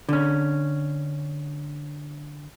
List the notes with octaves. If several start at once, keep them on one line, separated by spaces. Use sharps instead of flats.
D3 C#4